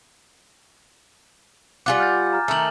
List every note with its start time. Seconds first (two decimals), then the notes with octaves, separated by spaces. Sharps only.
1.86 G3 F4 F#5 G#5 D6
2.00 F6 G6 A6
2.33 A#5 F6
2.48 D#3 A3 A5 A#5 F#7